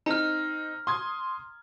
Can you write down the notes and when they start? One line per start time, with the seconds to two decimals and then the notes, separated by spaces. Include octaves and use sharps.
0.06 C4 D#4 A#5 F6
0.87 C6 D#6 G#6